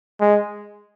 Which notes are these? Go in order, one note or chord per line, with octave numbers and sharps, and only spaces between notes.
G#3